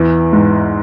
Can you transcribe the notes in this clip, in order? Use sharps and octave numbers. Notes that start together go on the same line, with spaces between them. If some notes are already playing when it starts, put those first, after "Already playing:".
Already playing: E2 E3
G#2